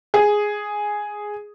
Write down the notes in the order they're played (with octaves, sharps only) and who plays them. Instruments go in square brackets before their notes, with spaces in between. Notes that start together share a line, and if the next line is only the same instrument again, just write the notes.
[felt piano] G#4